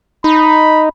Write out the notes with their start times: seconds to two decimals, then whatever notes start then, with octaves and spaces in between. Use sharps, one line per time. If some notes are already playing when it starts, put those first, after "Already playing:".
0.24 D#4 B5